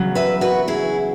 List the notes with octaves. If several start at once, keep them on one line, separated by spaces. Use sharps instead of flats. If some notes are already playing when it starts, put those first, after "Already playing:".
Already playing: E2 C#3 F#3
B4 E5
F#4 B4
E4 G#4